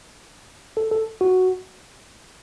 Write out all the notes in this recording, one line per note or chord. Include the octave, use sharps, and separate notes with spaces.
A4
A4
F#4